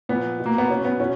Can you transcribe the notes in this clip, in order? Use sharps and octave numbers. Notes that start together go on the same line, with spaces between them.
A#2 F3 B3
B2
A#3
B3
B2 C#4
B3
B2 C#4